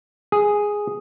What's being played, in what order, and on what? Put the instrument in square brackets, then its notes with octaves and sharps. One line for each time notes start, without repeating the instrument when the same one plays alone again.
[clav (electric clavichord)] G#4